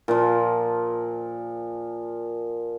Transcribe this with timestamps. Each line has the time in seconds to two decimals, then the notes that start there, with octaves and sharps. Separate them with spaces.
0.08 A#2 F3